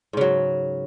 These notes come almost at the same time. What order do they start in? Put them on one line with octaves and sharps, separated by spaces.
G#2 C#3 F#3